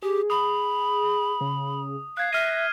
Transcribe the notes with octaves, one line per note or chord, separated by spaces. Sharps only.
G4 G#4
B5 D#6
C#3
F5 F#6 G#6 C7
E5 F6 A#6 D#7